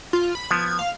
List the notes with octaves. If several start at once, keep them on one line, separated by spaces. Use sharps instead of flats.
F4
B5
F3 B3 G#6
F5